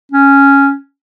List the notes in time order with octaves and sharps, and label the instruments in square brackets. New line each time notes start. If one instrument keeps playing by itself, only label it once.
[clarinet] C#4